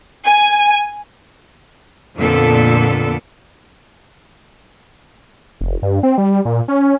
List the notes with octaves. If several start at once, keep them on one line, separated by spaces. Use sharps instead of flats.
G#5
F2 A#2 D3 B3 A4
F1
G2
C4
G3
A#2
C#4